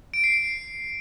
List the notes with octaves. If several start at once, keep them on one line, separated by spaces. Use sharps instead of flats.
D7
C7
C7